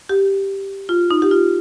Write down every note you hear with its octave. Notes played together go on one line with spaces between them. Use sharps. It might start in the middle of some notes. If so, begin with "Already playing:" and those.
G4
F4
D#4
G4
F4